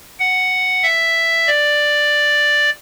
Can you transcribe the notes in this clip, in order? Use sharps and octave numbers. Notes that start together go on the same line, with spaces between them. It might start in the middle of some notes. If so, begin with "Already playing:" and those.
F#5
E5
D5